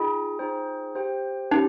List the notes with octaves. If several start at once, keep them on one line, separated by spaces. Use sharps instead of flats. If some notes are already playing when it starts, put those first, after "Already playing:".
Already playing: D#4 F4 G#4 D#5 G5
D#4 G#4 C5 G5
G4 C5 G5
C#4 D#4 G4